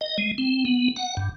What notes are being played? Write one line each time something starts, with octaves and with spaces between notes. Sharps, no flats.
D#5
G#3
C4
B3
F#5
G2